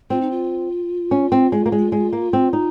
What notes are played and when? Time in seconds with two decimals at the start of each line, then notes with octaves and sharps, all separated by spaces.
0.10 C4 F4
0.21 D#4
0.31 F4
1.11 C#4
1.32 C4
1.52 G#3
1.66 A#3
1.72 G#3
1.92 G#3
2.13 A#3
2.33 C4
2.53 D#4